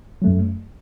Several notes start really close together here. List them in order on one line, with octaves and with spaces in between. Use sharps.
F#3 A3 F#2